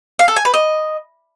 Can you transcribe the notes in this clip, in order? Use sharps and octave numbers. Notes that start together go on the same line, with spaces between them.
F5
A4
G#5
B4
D#5